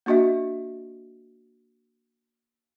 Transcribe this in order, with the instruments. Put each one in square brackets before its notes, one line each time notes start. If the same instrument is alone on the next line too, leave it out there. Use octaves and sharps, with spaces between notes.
[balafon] A#3 D4 F#4 D#5 E5